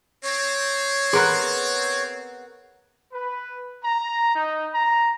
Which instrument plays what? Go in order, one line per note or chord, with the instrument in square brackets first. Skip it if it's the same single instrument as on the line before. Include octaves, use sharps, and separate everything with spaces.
[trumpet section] C4 [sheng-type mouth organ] C#5
[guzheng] B3 A#4 B4 [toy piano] G#4 C6
[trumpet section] B4
A#5
D#4
A#5